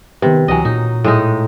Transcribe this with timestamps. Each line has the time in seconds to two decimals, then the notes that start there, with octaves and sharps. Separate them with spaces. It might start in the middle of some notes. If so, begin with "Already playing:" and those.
0.22 C3 D#3 B3 B4
0.48 C#2 E3 F#3 D#5 G#5
0.65 A#2 D#4
1.04 A2 G#3 D#4